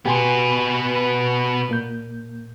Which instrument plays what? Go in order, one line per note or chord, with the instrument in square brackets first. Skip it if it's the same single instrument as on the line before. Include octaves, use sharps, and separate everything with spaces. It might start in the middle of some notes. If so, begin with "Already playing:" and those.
[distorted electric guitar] B2 B3 [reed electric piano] G4 G#5 C6
[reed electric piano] A#2 A#3 G6